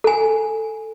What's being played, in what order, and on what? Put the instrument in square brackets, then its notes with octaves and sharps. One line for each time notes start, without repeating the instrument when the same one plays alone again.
[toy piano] A4 G#5